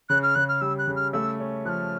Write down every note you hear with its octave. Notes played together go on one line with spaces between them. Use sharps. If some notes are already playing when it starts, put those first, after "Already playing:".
C#3 F#6
F6
C#3 F#6
F6
G3 E6
F#6
C#3
F6
A3 E6
C#4
F3 F6 F#6